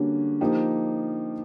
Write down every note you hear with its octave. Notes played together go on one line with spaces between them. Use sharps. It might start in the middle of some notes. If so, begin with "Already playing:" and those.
Already playing: D3 G3 A#3 C#4 F#4
F3 A#3 D#4 G4